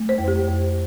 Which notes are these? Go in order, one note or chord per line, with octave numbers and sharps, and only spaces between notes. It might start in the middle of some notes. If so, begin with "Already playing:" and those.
Already playing: A3
C5
F2
G4
F2